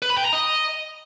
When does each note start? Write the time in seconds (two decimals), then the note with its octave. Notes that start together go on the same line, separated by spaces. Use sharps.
0.02 B4
0.10 B5
0.18 G5
0.25 A#5
0.33 D#5